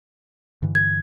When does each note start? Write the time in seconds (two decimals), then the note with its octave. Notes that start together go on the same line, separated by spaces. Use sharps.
0.62 G2 D3 E3
0.75 G#6